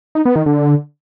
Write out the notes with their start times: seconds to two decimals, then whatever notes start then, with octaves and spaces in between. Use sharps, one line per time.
0.15 D#4
0.25 B3
0.36 D#3
0.46 D3